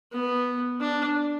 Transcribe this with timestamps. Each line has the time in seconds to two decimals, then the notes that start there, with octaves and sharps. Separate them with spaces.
0.12 B3
0.80 D4